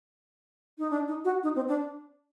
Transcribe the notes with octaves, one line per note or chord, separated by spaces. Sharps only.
D#4
D4
D#4
F#4
D#4
C4
D4